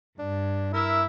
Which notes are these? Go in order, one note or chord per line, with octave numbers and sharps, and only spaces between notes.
G2 D4
E4 A#4 E5